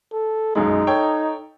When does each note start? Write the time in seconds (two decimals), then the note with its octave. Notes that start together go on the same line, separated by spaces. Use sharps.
0.13 A4
0.56 B1 F#2 G#3 D#4
0.87 A4 C#5 G5